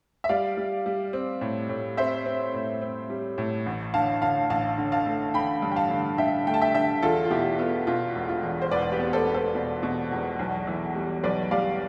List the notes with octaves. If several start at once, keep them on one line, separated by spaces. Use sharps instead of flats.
E5
G3 D5 F5
G3
G3
C4
A2
A2
C4 C5 E5
C4
A2
C4
G3
A2
A1
D3 F5 A5
D3 F5 A5
A1 F5 A5
D3
F5 A5
A3
D3 G5 B5
G2
G5
F5 A5
D3
D3 E5 G5
A3 G5
A5
E5 G5
D3 E5 G5
E2 F4 A4
F4
B2 E4 G4
B3 F4 A4
B2 F4
E1
F4
E2
C5
E1 B4 D5
G4 B4
B3
A4 C5
B3
A4 C5
B2
B2
E2
B1
E3
G3
B1 B4 D5
G3 D5 F5